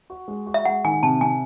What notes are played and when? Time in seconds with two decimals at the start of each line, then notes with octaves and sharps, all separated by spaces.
0.10 F#4
0.28 G#3
0.46 F#4
0.54 E5
0.65 G#3 F#5
0.84 D#3 G#5
1.03 C3 A5
1.21 C3 G#5